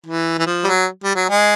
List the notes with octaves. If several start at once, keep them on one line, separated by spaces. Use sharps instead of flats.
E3
E3
F3
G3
F#3
G3
F#3
G#3